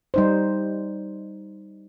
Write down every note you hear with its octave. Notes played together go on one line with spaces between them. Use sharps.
G3 D#4 C5